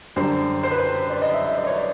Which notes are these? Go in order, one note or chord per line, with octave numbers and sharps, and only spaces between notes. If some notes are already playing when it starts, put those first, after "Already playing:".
F#2 D3 G3 C5
C5
B4
C5
D5
D#5
E5
E5
D5
C#5
D5